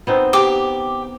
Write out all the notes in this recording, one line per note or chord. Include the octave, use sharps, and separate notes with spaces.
B3 C4 D#4
G4 D6